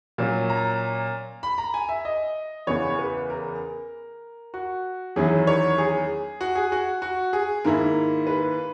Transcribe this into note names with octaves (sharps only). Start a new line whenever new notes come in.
A#2 F#3 C#4
A#5
B5
A#5
G#5
E5
D#5
E2 C#3 E3 B3 C#5
B4
A#4
F#4
E2 D#3 F#3 C#4 E4 G#4
C#5
G#4
F#4
G#4
F#4
F#4
G#4
G#2 D#3 A#3 E4 A#4
B4